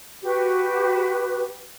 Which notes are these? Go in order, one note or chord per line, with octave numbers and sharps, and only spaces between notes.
F#4 G4 B4